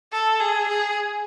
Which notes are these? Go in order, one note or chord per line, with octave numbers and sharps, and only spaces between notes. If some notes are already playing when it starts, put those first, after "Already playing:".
A4
G#4
G#4